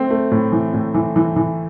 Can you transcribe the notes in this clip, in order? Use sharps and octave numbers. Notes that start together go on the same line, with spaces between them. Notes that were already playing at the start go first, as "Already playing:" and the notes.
Already playing: A3 C4
A3
A2
E3
A2
E3
E3
E3